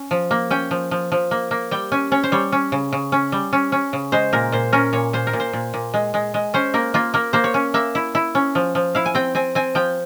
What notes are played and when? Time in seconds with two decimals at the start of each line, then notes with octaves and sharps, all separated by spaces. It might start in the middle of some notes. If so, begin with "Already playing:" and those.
Already playing: C#4
0.11 F3
0.31 A#3
0.51 C#4 G5
0.71 F3
0.91 F3
1.12 F3
1.31 A#3
1.51 A#3
1.71 G3 G5
1.92 C#4 G#5
2.12 C#4 C#5
2.23 C5
2.32 G3 C#5
2.52 C#4
2.72 C#3
2.93 C#3
3.12 C#4
3.32 G3
3.53 C#4
3.72 C#4
3.93 C#3
4.12 G#3 C5
4.33 A#2 A#4
4.52 A#2 C5
4.73 C#4 A#4
4.93 A#2 C#5
5.13 A#2 C5
5.27 A#4
5.33 A#2
5.40 C5
5.53 A#2
5.74 A#2
5.94 G#3
6.14 G#3
6.34 G#3
6.54 C#4 C5
6.74 A#3 A#4
6.94 A#3 F4
7.14 A#3 A#4
7.33 A#3 C5
7.44 C#5
7.54 C#4
7.74 A#3 E5
7.95 E4
8.15 E4
8.35 C#4
8.55 F3
8.75 F3
8.95 E4 F5
9.06 G#5
9.15 C4 G5
9.35 C4 G#5
9.55 C4 G#5
9.75 F3 G5